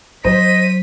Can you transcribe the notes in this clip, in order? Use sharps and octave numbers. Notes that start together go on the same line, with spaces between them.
F#3 C5 D#5 B6 D#7